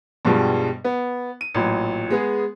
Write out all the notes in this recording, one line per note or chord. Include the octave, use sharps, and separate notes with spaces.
G2 B2 F3 G3 G#3
B3
D#7
A1 A#2 F#3
G#3 B3 G#4